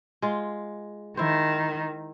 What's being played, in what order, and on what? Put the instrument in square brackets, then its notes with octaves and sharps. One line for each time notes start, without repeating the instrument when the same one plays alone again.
[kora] G#3 F4
[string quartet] D#3 [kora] E4 C5